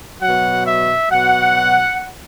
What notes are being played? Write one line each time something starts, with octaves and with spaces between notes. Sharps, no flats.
B2 F#3 F#5
E5
B2 F#3 F#5